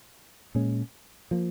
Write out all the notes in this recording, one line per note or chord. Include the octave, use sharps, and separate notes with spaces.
A#2 G#3 C#4
F3 A#3